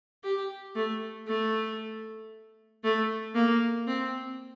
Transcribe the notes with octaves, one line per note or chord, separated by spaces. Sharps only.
G4
A3
A3
A3
A#3
C4